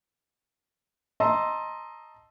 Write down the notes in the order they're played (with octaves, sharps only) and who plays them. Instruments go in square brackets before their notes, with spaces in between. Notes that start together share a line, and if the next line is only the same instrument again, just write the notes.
[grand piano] D#5 A5 A#5 C6 E6